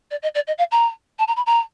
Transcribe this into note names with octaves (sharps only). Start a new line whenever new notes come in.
D5
D#5
D5
D#5
F5
A#5
A5
A#5
B5
A#5